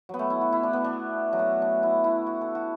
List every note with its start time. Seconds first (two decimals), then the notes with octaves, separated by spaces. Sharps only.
0.09 F#3 B3
0.19 A3
0.30 E4
0.41 F#4
0.53 E4
0.63 D4
0.73 B3
0.84 D4
1.33 F#3
1.39 A3
1.62 D4
1.83 E4
2.04 E4
2.27 F#4
2.41 A4
2.55 F#4